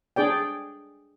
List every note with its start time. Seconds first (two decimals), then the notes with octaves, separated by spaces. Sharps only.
0.16 D4 G#4 D5 G5